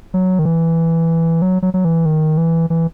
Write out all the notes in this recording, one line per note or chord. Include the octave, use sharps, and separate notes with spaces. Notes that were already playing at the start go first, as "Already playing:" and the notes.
F#3
D#3
E3
F#3
F#3
F#3
E3
D#3
E3
E3